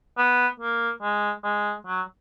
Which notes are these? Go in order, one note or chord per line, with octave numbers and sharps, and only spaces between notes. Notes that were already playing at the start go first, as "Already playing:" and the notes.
B3
A#3
G#3
G#3
F#3